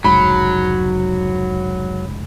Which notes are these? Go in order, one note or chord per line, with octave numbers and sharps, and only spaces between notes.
F1 C#2 G#2 F#3 B5